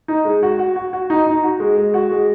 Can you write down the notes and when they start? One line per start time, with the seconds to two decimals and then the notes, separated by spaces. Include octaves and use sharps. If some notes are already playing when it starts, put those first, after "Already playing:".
0.08 D#4
0.25 G#3
0.43 F#4
0.59 F#4
0.76 F#4
0.93 F#4
1.10 D#4
1.27 D#4
1.44 F#4
1.60 G#3
1.78 G#3
1.94 F#4
2.11 G#3